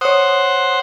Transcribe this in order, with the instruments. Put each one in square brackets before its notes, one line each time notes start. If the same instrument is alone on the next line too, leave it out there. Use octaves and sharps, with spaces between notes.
[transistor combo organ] C5 F#5 [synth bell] C#5 D#6